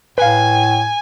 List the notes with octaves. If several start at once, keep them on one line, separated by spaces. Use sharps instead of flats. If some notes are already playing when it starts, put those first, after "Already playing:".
A2 B4 F5 G#5